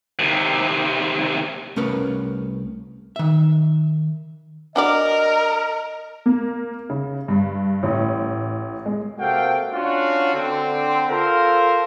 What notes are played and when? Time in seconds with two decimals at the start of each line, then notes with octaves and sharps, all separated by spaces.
0.19 D#2 C3
1.76 C2 A3 C#4 A#4 B4
3.16 D#3 E5
4.76 D4 F#4 A#4 D5 D#5
6.26 A#3
6.90 C#3
7.28 G2
7.83 A1
8.86 G#3
9.19 C3 A#3 F#4 A4 F5 G5
9.74 C#4 D4 F4 F#4
10.35 D3 C4
11.10 F4 A4 A#4 C5